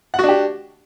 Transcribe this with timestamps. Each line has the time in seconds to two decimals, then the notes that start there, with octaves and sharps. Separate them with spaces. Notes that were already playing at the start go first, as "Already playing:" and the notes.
0.14 F#5
0.19 F#4
0.24 D4
0.29 G4